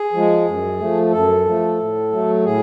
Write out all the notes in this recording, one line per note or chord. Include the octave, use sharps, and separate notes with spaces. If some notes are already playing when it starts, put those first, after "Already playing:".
Already playing: G#4
F3 G#3
F#2
F3 A3
F#2 A4
F3 A3
A2
F#3 A3
A2 G#4